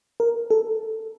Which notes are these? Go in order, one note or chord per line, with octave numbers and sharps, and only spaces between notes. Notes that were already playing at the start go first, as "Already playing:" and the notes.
A#4
A4